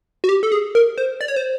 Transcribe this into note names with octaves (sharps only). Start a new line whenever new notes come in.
F#4
G4
A4
G#4
A#4
C5
D5
C#5
C5